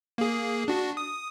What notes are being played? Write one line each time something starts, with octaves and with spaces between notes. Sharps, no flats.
A#3 G#4
D4 F#4
D#6